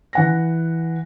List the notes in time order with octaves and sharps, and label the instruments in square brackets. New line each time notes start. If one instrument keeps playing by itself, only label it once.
[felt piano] E3 F#5 A#6